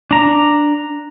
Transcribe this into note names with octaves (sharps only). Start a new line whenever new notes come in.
D4 A#5